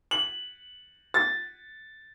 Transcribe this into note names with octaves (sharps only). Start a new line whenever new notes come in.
F#7
A6